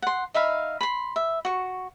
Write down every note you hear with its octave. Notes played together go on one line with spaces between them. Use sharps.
F#5 C6
D#4 E5 F5 B5
B5 C6
E5
F#4 C#6